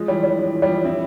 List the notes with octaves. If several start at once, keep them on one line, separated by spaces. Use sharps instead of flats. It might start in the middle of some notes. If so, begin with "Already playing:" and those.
Already playing: F3 G#3
E3 G3
E3 G3
F3
E3
G3
F3
C4 E4